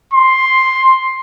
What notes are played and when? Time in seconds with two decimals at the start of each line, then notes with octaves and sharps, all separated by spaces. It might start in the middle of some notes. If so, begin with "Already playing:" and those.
0.14 C6